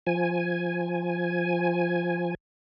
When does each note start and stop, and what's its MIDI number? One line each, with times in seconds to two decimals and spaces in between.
0.07 2.35 53
0.07 2.35 80